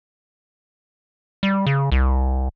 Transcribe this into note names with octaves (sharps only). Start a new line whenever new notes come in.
G3
C#3
C2